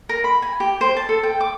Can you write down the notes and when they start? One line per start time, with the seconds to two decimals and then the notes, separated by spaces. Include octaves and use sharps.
0.09 A#4
0.24 B5
0.42 G#5
0.60 G4
0.81 C5
0.97 A5
1.09 A4
1.23 G5
1.40 D6